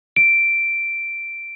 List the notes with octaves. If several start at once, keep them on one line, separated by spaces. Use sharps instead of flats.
D7